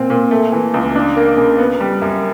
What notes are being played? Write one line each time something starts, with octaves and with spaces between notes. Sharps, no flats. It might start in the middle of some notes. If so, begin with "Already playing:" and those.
Already playing: A#2 C4
A#2
A3
E3
C#2
D4
A#3
C#3
B3
G3
F#2